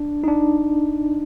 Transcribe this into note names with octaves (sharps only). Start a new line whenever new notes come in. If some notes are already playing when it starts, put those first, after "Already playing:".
Already playing: D4
D#4
D4